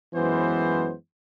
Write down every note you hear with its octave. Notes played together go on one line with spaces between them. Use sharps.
F#2 E3 G#3 B3 C5